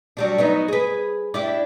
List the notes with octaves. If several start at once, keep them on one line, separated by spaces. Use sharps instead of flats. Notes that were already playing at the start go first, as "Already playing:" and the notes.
F#3 G3 D4
F#3 B3 D#4
G#4 B4
D4 E4 G4